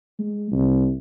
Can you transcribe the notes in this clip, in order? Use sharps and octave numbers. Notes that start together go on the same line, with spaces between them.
G#3
C2